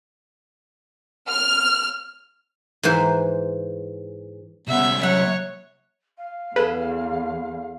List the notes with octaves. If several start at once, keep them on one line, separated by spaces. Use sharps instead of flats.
F6
G#2 E3 C5
C2 B3 C#4 E5 E6
F#3 C#5 E5 F#5
F5
E2 G#4 A4 B4